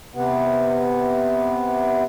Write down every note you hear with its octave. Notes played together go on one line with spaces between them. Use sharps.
C3 B3